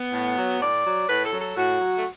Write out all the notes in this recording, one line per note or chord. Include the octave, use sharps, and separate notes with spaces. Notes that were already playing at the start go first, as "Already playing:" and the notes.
Already playing: B3
A2
F#3
A2 D5
F#3
A2 B4
A4
F#3
A4
A2 F#4
F#3
A3